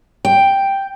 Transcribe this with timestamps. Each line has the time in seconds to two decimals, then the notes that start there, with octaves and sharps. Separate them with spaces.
0.25 G5